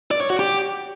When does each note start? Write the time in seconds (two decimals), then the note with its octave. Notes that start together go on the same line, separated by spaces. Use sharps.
0.11 D5
0.21 C#5
0.30 F#4
0.39 G4